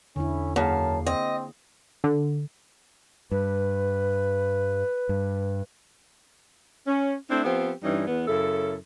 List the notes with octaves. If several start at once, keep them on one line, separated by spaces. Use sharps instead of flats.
E2 D3 C#4 E4
F#2 A#3 G#4 F5 A5
C4 D#5
D3
G2 B4
G2
C#4
A3 C4 D4 E4
F3 B3 C4 G4
G2 E3 G3 C#4 D#4
E2 B3
F#2 C#3 E4 A4